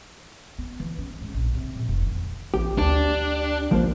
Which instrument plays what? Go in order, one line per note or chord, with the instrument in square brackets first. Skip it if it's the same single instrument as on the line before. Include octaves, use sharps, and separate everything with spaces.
[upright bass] B3
E3
C#4
G#2
A#1
C3
A#1
F1
D#3
[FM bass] A1 [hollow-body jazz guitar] G4
[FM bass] D2 [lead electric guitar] D4
[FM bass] A1 [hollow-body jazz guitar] F3 A#3 C5